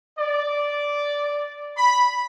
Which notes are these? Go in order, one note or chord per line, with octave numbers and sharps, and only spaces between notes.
D5
B5